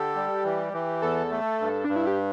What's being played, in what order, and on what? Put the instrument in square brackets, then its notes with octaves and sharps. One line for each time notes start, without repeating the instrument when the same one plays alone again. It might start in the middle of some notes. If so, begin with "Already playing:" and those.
Already playing: [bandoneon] D3 A4 [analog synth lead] G4
[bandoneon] G3
E3
E3
[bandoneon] E2 [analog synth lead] A4
[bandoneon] A3
G2
[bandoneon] G2 [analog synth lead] D4
[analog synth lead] E4
G4